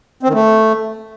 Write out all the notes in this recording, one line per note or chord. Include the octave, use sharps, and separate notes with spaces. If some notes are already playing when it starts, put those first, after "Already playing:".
C4
D#3
A3